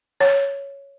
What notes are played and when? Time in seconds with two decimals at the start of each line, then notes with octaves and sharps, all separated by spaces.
0.20 C#5